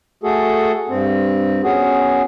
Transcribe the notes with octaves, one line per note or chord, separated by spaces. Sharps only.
A3 F#4 G#4 A4
G2 C4
B3 C#4 F#4 G#4